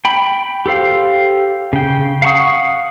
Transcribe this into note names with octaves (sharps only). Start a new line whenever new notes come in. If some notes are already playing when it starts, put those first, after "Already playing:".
G5 B5
G4 A4 C5 F5
C#3 G5
F5 F#5 A5 C#6 D#6